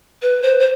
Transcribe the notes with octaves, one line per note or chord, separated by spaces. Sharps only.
B4
C5
C5